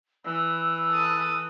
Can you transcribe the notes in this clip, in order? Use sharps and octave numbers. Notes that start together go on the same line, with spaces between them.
E3 B5 E6
A4 D#6